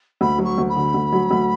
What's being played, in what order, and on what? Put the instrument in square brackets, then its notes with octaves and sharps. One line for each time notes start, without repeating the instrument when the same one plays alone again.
[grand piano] D2 [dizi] B5
[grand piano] F#3
[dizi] C#6
[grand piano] D2
[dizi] B5
[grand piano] D3
D2
F#3
D2